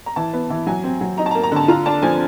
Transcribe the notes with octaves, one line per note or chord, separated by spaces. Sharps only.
A#5
E3 A5
B3
E3
F#3 G#5
C4
F#3
D#4 A#5
A5
A#5
A#3
A#5
D3 A5
F4 A#5
D4 A5
F3 G#5